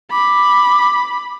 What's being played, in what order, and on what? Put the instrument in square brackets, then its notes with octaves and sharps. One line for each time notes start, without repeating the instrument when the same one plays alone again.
[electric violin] B5 [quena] D6